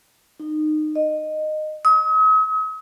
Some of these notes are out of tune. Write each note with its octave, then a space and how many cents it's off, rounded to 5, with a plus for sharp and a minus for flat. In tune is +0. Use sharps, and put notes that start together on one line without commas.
D#4 -25
D#5 -15
D#6 +45